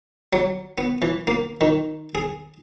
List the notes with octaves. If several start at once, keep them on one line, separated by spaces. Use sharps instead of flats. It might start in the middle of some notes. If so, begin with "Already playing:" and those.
F#3
B3
E3
A#3
D#3
G#4